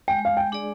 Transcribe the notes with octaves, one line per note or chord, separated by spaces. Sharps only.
G#3 G5
F5
G5
D4 G#4 D5